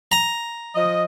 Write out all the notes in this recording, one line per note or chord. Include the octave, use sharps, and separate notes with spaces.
A#5
F3 D#5